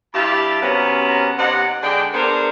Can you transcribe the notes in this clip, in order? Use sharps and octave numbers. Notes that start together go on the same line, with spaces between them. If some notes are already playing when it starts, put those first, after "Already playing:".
G2 E4 G4 F5 A5 B5
C3 F#3 B3 C#4 A#4 A#5
C3 B3 D#4 F#5
D3 G#3 D4 G5
B3 D4 G#4 A#4 C5